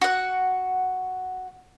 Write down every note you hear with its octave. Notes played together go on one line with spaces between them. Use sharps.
F#4 F#5